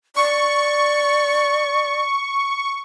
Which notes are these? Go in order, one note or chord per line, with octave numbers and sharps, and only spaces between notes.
D5 C#6